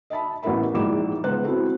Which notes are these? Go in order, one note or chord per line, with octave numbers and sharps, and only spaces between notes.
D#5 E5 A5 B5
A1 B3 E4 A#4 E5 B5
A#1 G#2 E4 D6 E7
C#2 B3 C5 F#6
C4 E4 F#4 A4